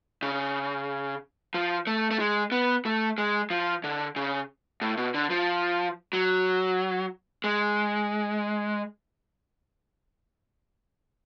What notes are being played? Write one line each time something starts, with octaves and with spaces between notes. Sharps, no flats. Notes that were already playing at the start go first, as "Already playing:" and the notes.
C#3
F3
A3
A3
G#3
B3
A3
G#3
F3
D3
C#3
A2
B2
D3
F3
F#3
G#3